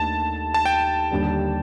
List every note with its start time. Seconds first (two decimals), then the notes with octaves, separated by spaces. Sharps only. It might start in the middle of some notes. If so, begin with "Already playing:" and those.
Already playing: D#2 D#3 A3 D4 A5
0.54 A5
0.65 G5
1.11 D#2 D3 G3 D4